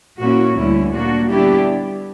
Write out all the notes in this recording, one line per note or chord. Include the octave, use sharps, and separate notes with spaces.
A#2 A#3 C#4 E4 F#4
D2 D3 G3 C#4 E4
A#2 A#3 D4 F#4
D3 G3 B3 D4 E4 G4